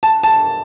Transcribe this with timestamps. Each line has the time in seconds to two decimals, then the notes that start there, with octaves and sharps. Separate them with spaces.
0.03 A5
0.23 A5